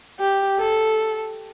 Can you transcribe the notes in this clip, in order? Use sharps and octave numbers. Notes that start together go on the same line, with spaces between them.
G4
A4